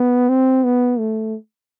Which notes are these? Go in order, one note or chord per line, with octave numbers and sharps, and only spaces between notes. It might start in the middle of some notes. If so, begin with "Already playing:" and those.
Already playing: B3
C4
B3
A3